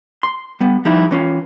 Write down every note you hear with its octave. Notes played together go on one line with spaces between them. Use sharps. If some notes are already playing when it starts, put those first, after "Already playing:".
C6
G3 B3
F3 G3 D#4 E4
E3 C#4 F4